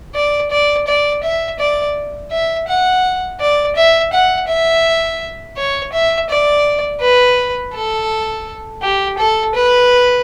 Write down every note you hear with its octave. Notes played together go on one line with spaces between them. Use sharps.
D5
D5
D5
E5
D5
E5
F#5
D5
E5
F#5
E5
C#5
E5
D5
B4
A4
G4
A4
B4